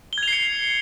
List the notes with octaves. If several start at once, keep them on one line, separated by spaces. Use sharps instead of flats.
G#6 C7 C#7 F7 G7